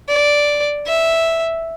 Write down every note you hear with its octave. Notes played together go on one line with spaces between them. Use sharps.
D5
E5